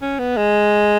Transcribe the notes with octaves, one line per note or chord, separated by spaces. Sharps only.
C#4
B3
G#3